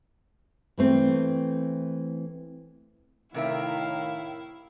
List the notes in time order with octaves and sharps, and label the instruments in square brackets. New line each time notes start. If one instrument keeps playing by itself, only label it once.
[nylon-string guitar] E3 A3 C4
[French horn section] A2 D#3 [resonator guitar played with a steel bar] C3 A#4 E5 [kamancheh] E4 [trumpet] F5